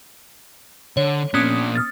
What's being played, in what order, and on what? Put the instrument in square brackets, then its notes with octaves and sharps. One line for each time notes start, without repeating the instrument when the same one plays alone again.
[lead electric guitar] D3 [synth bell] C#5
[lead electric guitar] A#2 D4 [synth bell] B3 C#4 D#6
[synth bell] D#6 F6 A6